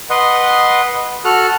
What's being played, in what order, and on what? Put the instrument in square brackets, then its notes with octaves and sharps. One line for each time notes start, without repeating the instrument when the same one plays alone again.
[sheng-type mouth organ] B4 D#5 F#5 C6
F#4 A4 F6 F#6